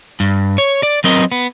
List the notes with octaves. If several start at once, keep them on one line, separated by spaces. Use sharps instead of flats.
G2
C#5
D5
F#3 B3 C4 A#4 D#5
B3